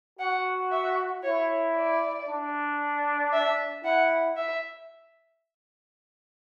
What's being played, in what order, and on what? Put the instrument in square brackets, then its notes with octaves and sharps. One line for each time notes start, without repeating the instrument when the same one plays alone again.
[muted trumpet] F#4 [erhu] F#5
[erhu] E5
[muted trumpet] E4 [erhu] C#5
[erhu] D5
[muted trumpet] D4
[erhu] E5
[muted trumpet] E4 [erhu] F#5
[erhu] E5